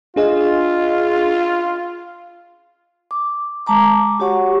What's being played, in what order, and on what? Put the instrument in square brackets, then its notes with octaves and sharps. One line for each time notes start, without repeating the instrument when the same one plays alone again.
[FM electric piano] D4 G#4 D#5 [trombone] F4
[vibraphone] D6
G#3 A5 A#5 D6
F#4 G4 C#5 F#5 C#6